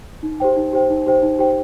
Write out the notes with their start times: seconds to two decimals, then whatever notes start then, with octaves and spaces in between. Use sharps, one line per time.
0.23 D#4
0.40 G4 C5 G5
0.56 D#4
0.73 G4 C5 G5
0.90 D#4
1.07 G4 C5 G5
1.22 D#4
1.39 G4 C5 G5